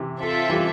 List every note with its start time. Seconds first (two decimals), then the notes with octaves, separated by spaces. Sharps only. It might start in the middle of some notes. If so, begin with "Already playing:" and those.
Already playing: C3 E3
0.18 C4 F4 A4 E5
0.50 E3 G3